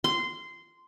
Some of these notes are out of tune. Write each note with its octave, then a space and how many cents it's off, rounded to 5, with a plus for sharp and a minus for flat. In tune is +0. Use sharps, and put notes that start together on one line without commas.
C6 -15